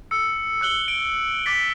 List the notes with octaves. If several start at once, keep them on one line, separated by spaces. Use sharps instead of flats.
E6 C#7
E6 F#6 F#7 G7
D7
D6 A6 B6